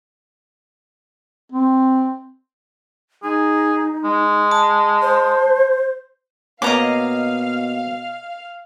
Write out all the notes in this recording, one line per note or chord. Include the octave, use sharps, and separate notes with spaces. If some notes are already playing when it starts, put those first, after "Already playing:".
C4
D#4 G#4
G#3
A5
C5
B2 A#3 B3 C#4 D#5 F5 A#5 D6